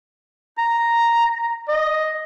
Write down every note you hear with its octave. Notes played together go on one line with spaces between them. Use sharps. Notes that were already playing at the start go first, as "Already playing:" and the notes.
A#5
D#5